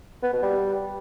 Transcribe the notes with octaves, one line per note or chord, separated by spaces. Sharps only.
B3
B2
G3